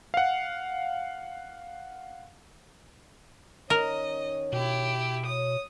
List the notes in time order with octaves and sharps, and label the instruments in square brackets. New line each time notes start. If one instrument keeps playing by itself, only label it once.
[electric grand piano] F5 F#5
[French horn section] D#3 C#4 C#5 [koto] A#4 [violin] D#5
[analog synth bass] B2 [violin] E4 G4
[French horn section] C#5 [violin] D#6